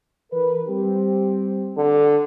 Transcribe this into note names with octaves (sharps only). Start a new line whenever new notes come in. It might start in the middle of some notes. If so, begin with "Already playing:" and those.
E3 A#4 B4
G3 C4 G4
D3